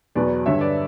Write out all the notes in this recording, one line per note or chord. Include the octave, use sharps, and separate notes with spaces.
E2 B2 F#3 B4 D5
G2 D3 G3 C#5 E5
B4 D5